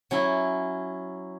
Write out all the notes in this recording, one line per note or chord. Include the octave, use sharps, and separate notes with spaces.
F#3 C#4 E4